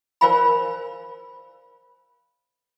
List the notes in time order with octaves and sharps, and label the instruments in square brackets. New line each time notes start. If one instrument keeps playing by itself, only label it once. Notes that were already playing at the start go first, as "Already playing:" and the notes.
[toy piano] A#4 C5 D5 F5 G#5 B5